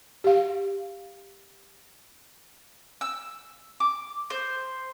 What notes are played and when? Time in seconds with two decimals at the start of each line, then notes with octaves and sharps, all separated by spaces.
0.24 G4 F5
3.01 E6
3.80 D6
4.30 C5